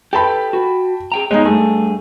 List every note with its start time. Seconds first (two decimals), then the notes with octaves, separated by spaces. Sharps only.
0.13 G4 A4 B4 G5 A5 B5
0.53 F#4
1.12 G#4 G5 A#5
1.31 G#3 B3 D#4 C#5 D#5
1.45 G2 A3 G#4